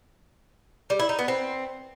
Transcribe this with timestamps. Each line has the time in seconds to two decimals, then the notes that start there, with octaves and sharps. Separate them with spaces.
0.90 G3
1.00 E4
1.09 D#4
1.19 B3
1.28 C4